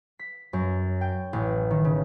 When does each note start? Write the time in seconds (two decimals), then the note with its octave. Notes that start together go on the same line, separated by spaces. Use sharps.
0.19 B6
0.53 F#2
1.01 G5
1.33 A1
1.71 D#3
1.84 C#3